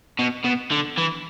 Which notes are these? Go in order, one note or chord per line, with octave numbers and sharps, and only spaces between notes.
B2
B2
D3
E3